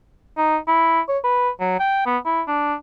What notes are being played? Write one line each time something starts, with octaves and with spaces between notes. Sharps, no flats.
D#4
E4
C#5
B4
F#3
G5
B3
E4
D4